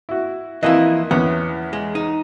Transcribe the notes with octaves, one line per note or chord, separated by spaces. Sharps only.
E4 F#4
F2 E3 A#3 E4 D#5
E2 B3 C#4
G#3
D#4